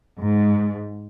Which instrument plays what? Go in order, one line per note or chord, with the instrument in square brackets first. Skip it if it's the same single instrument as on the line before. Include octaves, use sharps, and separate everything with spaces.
[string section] G#2